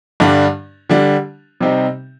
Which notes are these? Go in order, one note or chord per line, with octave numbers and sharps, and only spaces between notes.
G2 D3 G3 D4
D3 G3 D4
C3 G3 C4 D#4